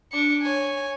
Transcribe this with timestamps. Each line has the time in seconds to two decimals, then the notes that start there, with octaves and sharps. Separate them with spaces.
0.12 D4 C#7
0.42 C#5 G#5